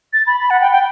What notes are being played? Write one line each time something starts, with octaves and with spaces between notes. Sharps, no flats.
A6
B5
B5
F#5
G5
G5